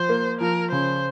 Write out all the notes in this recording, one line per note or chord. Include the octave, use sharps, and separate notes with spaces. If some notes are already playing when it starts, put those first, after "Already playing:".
Already playing: F3 C5
A#3
F3 A#4
C#3 C5